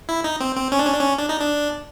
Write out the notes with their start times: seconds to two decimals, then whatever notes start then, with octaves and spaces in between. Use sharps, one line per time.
0.09 E4
0.24 D#4
0.40 C4
0.57 C4
0.72 C#4
0.79 D4
0.85 C#4
0.93 D4
1.00 C#4
1.18 D4
1.29 D#4
1.39 D4